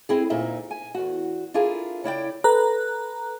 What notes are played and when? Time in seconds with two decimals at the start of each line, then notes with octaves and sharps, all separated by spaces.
0.09 C4 E4 G#4
0.30 D2 A#2 D#4 E5
0.71 G#5
0.95 E2 F#4
1.54 D4 E4 F4 G#4 A#4
2.04 C#3 E4 D5 G5
2.44 A4 B4 A#5 F#6